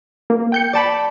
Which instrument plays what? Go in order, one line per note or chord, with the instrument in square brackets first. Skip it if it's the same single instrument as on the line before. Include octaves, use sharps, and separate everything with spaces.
[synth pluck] A#3
G5 G6 C#7
[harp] D5 A5 B5